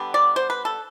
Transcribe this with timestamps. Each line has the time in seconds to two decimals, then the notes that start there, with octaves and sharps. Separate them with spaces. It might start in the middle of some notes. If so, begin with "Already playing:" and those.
Already playing: D3 G3 B3
0.14 D5
0.36 C5
0.50 B4
0.65 A4